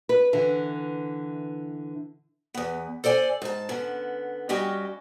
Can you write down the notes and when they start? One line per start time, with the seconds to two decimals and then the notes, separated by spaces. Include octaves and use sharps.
0.09 B4
0.33 D3 E3
2.54 E2 B3
3.04 A4 C5 D5 G5 G#5
3.42 G#2 A5
3.69 D3 B3 C#4
4.49 G3 C#4 F#4 G4 D#5